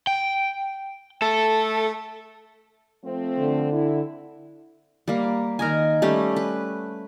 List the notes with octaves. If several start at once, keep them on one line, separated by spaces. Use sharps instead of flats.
G5
A3 A4
F3 A3 C4
D3
E4
G3 A#3
D#3 A#4 D#5 G#5
G3 A3 C#4 G4
B4